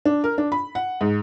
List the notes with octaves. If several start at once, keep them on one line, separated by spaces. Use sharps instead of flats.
D4
A#4
D4
B5
F#5
G#2